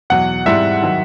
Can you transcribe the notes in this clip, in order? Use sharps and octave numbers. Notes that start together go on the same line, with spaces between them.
E2 B2 F#3 F#5
G#2 E3 G3 C4 E4 E5
D#3 F#3